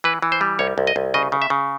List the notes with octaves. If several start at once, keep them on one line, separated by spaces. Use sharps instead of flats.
E3 B4
E3
C5
G3
C2 C#5
C2
D#5
C2
C#3 D#5
C#3
E5
C#3